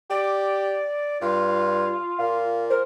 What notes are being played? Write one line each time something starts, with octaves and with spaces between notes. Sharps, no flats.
G4 D5
G2 F4
A#2 F5
A#4 C5